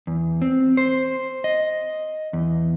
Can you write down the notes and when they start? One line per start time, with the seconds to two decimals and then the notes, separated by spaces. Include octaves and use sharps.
0.07 E2
0.42 C4
0.77 C5
1.44 D#5
2.33 E2